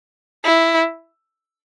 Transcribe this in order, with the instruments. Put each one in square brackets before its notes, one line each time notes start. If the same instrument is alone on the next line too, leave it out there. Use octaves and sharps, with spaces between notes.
[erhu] E4